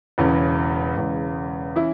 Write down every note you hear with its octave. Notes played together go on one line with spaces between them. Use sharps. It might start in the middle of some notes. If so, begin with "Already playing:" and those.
E1 E2 C#3 E3 C#4
E1 E2 C#3 G#3
E3 C#4 E4